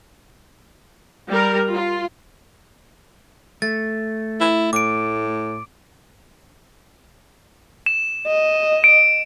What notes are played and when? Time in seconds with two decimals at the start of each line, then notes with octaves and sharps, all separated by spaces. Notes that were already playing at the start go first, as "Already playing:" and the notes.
1.29 G3 A#4
1.71 F4
3.62 A3 A6
4.41 E4
4.73 A2 D6 D7
7.86 E7
8.27 D#5
8.84 D7